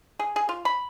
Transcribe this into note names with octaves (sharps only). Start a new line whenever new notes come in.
G#4
G#4
F4
B5